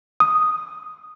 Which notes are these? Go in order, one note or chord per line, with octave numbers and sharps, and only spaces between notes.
D#6